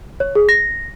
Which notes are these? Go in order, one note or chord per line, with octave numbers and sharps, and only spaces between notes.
C#5
G#4
A#6